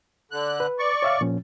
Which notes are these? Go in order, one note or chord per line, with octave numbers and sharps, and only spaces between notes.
D3 F#6
B4
D5 C#6
C#5 E5 F5
A#2 F3 C#4